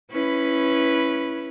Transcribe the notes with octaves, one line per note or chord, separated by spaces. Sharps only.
C#4 E4 B4